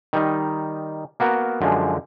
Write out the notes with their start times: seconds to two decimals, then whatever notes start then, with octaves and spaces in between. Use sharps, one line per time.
0.13 D#3 G3 D#4
1.20 A#3 B3 F#4 A#4
1.61 F#2 D3 F3 G#3